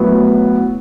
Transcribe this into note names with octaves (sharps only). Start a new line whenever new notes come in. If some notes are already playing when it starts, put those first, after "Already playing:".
Already playing: A2 F#3 B3